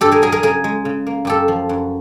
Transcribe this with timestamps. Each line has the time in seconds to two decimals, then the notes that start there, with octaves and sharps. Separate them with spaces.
0.01 G2 G4 A4
0.11 G#4 A#4
0.22 F#3 G#4 A#4
0.32 G#4 A#4
0.43 C#3 G#4 A#4
0.64 G#3
0.85 C#3
1.07 A#3
1.25 F#2 G4 A4
1.48 F3
1.69 F#2